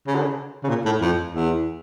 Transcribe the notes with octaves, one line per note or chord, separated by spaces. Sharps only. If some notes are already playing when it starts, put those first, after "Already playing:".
C#3
D3
C#3
C#3
A#2
A2
F2
E2